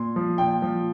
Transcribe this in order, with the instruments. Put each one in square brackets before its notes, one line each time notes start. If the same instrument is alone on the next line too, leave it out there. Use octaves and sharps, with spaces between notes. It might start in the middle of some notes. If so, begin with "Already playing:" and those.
Already playing: [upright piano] A#2 C6
F3
A#2 G5
F3